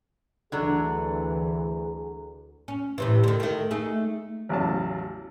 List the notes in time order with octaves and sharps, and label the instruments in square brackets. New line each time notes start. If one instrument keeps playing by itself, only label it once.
[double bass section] D2 E3 [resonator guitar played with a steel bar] D3 F#3 D4 [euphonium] G#4
[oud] C#4
A2 C3 E3
D3 D#3
D#3 A3
A3 D#4 G#4
[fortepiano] A1 E2 C#3 F#3 A5